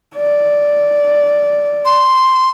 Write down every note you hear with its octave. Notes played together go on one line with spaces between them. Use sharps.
D5
C6